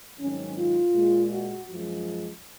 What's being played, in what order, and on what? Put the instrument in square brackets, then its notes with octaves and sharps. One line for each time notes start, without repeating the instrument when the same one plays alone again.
[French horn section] G#2 D#3 F#3 C#4
F4
A#2 G#3
F#4
F#2 F3 G#3